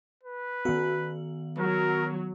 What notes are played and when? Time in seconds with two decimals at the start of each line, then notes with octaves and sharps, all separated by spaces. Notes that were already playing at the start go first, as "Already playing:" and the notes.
0.23 B4
0.65 D#3 B3 F#4
1.58 F#3 A#4